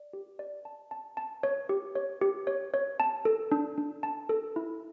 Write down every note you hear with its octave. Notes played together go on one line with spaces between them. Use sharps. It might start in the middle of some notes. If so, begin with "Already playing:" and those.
Already playing: D5
G4
D5
A5
A5
A5
C#5
G4
C#5
G4
C#5
C#5
A5
A4
D4
D4
A5
A4
E4